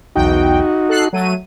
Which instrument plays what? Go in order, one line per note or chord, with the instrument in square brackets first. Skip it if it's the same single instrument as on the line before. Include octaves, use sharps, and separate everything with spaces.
[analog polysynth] B1 E2 G5 [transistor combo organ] D#4 F#4
[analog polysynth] A4 F#6 C7
F#3 A3 D#7